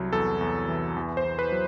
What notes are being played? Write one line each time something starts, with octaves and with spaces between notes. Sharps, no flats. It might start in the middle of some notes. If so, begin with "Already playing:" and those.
Already playing: C2 F#3
E2 A4
E2
E3
E2
C5
E2
B4
F#3